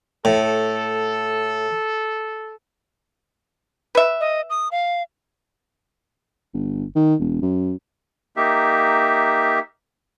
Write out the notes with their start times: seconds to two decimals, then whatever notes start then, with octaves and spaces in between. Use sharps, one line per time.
0.25 A2 A4
3.95 B4 E5
4.21 D#5
4.50 D#6
4.72 F5
6.54 G1
6.95 D#3
7.20 E1
7.42 F#2
8.37 A#3 D#4 G4 E5